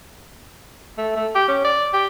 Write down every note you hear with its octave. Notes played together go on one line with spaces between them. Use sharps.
A3
A3
G4
C#4
D5
G4